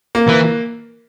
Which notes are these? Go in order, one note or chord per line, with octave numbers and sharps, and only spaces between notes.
A#3
E3